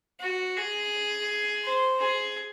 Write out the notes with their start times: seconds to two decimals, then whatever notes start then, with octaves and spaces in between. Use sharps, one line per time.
0.20 F#4
0.56 G#4
1.64 C5
2.00 G#4